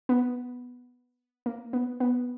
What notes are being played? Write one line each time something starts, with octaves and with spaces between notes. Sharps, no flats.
B3
A#3
B3
B3